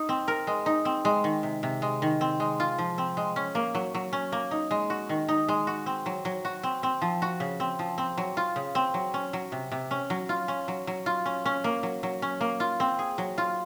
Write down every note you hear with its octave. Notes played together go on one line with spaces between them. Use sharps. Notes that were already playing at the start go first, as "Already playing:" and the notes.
Already playing: D#4
C4
A#4
G#3
D#4
C4
G#3
D#3
C3
C3
G#3
D#3
C4
G#3
F4
F3
C4
G#3
C#4
A#3
F#3
F#3
C#4
A#3
D#4
G#3
F#4
D#3
D#4
G#3
F#4
C4
F#3
F#3
F#4
C4
C4
F3
F#4
C#3
C4
F3
C4
F#3
F4
C#3
C4
F#3
C#4
F#3
C3
C3
C#4
F#3
F4
C#4
F#3
F#3
F4
C#4
C#4
A#3
F#3
F#3
C#4
A#3
F4
C4
G#4
F#3
F4